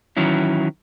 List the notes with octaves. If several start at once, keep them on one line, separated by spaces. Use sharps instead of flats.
D#3 E3 F#3 C#4 E4